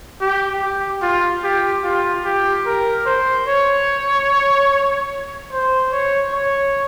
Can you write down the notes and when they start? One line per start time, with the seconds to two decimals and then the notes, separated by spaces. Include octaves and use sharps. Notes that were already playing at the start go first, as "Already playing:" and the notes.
0.21 G4
0.63 G4
1.02 F4
1.44 G4
1.84 F4
2.25 G4
2.66 A#4
3.06 C5
3.48 C#5
5.52 C5
5.92 C#5
6.33 C#5